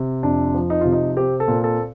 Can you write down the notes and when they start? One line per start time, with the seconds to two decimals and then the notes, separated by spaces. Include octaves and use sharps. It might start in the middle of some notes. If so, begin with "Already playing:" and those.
Already playing: C3
0.23 F2 D4
0.54 F3
0.70 D#4
0.81 C3 F4
0.92 D#4
1.17 C4 G4
1.40 A4
1.48 A#2
1.64 A4